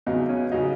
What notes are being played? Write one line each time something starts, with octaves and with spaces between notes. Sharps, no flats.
E2 C#3 F#3 D#4
C#4
C#3 F#3 D#4